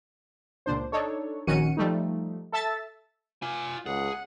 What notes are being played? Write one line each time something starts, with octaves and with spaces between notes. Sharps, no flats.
C#2 A#2 D4 C5
D4 D#4 A4 C#5
A#1 D#3 C#4 F#4 C#7 D#7
F3 G3 A3 D#4
A4 E5 A5 E6 A6
F4 G#5
C#2 G#4 F#5